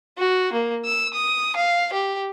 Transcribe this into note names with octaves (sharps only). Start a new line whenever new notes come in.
F#4
A#3
E6
D#6
F5
G4